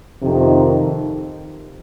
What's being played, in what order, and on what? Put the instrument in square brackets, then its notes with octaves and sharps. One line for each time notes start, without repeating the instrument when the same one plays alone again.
[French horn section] F2 C3 D#3